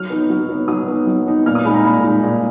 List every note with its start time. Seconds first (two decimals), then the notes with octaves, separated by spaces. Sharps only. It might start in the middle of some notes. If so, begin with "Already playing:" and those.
Already playing: F#3 F6
0.10 B3 D#4
0.30 F#3
0.49 B3 D#4
0.68 F#3 D#6
0.88 B3 D#4
1.07 F#3
1.27 B3 D#4
1.46 A#2 F6
1.55 D#6
1.65 G#3 D#4 B5
1.74 A#5
1.84 A#2 B5
2.03 G#3 D#4
2.23 A#2